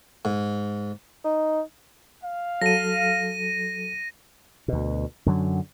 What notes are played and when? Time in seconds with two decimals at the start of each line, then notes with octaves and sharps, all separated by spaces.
0.25 G#2
1.24 D#4
2.22 F5
2.62 F#3 A4 A#6 D#7
4.68 D2 B2
5.26 F#2 D3 F#3